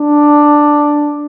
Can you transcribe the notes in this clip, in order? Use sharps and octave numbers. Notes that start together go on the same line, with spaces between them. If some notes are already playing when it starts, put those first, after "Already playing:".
Already playing: D4